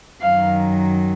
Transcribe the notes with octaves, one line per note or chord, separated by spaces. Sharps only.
F#2 D#3 F#3 F5